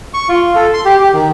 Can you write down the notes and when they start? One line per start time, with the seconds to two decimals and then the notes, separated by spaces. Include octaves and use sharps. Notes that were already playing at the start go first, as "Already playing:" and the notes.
0.14 C#6
0.29 F4
0.55 A4
0.73 C6
0.85 G4
1.00 G4
1.13 D#3